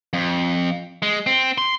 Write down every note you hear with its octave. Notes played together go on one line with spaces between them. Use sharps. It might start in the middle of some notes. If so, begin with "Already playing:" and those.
F2
G#3
C4
C6